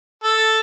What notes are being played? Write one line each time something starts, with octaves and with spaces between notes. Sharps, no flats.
A4